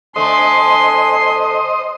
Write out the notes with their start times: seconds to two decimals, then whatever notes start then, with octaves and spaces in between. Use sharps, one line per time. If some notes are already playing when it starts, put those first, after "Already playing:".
0.16 D3 A3 C5 D#5 G#5 C6